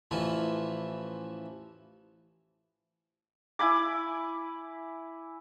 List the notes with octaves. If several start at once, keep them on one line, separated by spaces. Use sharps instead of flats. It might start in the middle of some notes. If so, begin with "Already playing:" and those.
A1 E3 F3 E4
E4 G#5 B5 D6